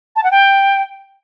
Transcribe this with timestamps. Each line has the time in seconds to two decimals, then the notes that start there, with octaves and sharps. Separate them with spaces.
0.16 A5
0.24 F#5
0.31 G5